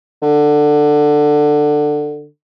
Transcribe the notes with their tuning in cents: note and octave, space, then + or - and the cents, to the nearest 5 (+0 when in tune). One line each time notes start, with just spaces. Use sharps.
D3 +15